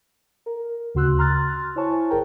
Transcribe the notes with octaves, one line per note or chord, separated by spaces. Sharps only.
A#4
D2 C#3 F#4 C6 E6 F#6
A#5 C6 F6 F#6 A6
E4 C5 C#5 G#5 A5 C#6
G1 G#4 A#4 G5 A#5